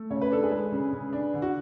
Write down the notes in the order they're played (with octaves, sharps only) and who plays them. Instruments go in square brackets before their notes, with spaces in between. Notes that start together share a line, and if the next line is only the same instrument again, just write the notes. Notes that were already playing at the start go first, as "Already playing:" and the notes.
Already playing: [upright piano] A3
C#3 C#5
B4
D4 A4
G#4 B4
G#3
C#3
C#3
D4
D3
F#4